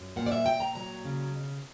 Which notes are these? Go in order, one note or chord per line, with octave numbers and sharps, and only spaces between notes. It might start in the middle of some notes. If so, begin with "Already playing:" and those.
Already playing: F#2
A#2 F#5
D5
E5
A#2 G5
A#5
F#3 A#5
C#3
B2